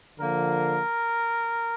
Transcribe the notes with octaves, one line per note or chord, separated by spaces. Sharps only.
D3 F3 A#3 A#4